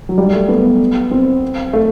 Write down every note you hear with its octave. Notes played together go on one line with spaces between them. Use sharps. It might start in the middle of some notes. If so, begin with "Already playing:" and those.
F#3
G3
A3
B3
C4
A3